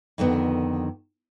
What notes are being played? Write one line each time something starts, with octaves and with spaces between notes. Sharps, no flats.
F2 D3 D#3 B3